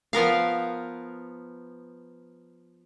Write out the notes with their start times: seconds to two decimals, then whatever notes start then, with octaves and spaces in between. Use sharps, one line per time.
0.13 F3 B3 A#4 F5